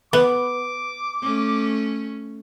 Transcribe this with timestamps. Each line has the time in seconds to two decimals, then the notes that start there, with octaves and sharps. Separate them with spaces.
0.13 B3 D6
1.22 A3 C#4